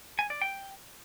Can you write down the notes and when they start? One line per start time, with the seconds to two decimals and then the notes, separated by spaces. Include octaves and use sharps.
0.19 G#5
0.30 D5
0.41 G5